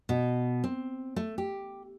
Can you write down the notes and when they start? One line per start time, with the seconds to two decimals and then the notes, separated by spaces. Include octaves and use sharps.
0.09 B2
0.64 C4
1.16 A3
1.38 G4